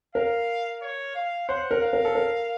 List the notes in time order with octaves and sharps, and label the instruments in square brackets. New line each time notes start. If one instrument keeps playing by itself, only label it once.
[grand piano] A#4 [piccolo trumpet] F5
[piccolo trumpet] C#5
F5
[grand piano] C5 [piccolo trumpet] F#5
[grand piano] A#4
[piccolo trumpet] F5
[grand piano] A#4
A4
A#4